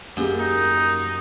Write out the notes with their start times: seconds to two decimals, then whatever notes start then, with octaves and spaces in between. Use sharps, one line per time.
0.17 F#2 A#3 G4 G#4
0.39 D#4